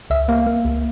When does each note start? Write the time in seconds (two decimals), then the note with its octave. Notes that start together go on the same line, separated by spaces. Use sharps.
0.10 C#2 E5
0.28 A#3 F5
0.47 A#3
0.65 C#2